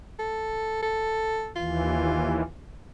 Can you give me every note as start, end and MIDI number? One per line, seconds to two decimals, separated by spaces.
0.19 0.81 69
0.83 1.50 69
1.56 2.43 39
1.56 2.43 52
1.56 2.48 65